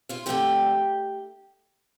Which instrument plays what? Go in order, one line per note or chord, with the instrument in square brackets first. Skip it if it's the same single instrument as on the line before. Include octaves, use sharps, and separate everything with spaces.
[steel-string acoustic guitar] F4 F5
F2 D3 A3 D4 G4 G5